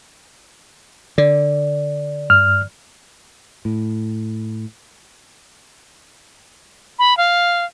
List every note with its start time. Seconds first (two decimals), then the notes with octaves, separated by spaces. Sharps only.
1.18 D3 D5
2.30 G2 F6
3.65 A2
6.99 B5
7.17 F5